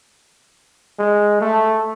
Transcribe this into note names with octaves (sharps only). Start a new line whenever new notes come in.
G#3
A3